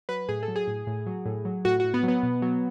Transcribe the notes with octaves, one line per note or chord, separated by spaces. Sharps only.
F#3 B4
A2 G#4
A4
F#3
G#4
A2
A2
F#3
A2
F#3
A2 F#4
A2 F#4
B3
F#3
B3
B2
F#3